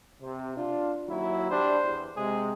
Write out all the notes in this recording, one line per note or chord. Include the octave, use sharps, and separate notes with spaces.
C3
D4 F4
D#2 F#3 E4
G3 D4 C5
E2
C3 G#3 G#4